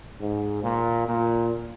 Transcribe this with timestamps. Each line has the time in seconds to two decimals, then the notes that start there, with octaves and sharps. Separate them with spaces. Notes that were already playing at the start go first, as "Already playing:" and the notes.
0.21 G#2
0.63 A#2
1.06 A#2